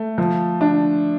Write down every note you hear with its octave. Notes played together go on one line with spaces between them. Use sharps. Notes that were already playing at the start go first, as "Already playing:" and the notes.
Already playing: A3
F3
D4